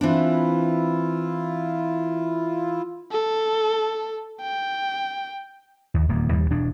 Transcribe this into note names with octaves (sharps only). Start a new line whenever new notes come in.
E3 C4 D4 E4 F4
A4
G5
D#2
D#1 E2 A#3
D#2 G3
E1 F2 D4